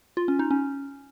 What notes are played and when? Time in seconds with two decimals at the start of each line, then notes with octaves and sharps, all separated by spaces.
0.17 F4
0.28 C#4
0.39 D#4
0.51 C#4